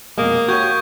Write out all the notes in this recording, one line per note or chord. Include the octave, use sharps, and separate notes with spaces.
F2 B2 G#3 A#3 D#6
F#4 G4 C#5 C#6 G6 G#6